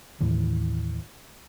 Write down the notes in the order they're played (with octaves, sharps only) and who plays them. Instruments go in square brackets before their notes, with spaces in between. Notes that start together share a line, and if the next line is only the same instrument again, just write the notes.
[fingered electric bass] D#2 A2 E3